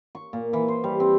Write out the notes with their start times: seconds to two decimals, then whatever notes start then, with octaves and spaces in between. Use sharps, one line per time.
0.15 C#6
0.33 A#2
0.53 E3
0.68 C5
0.84 G3
1.00 C4